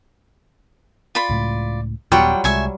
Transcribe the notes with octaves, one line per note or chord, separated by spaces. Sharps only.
F4 D5 B5
C#2 A2
D#1 F#3 G3 B3 F4 F#5 G5 C#6
C2 G#3 E5 G#5 C#6